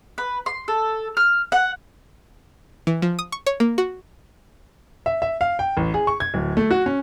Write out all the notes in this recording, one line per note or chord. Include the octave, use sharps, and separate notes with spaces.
B4
C6
A4
F6
F#5
E3
F3
D#6
C#6
C#5
A#3
F#4
E5
E5
F5
G5
A1
G#4
C#6
G#6
D1
A3
F#4
C#4